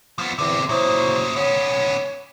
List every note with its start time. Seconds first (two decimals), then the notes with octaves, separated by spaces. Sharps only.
0.19 F3 B3
0.39 E2 D3 E3 C4
0.69 A#2 C#3 F#3 E4 C5
1.36 B3 C#4 C#5